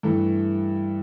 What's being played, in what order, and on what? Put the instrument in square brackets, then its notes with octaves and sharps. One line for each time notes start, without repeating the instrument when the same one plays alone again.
[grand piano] G2 E3 A3